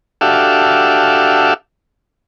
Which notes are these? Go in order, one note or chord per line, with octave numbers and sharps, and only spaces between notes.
D4 F#4 G4 A4 E5 F5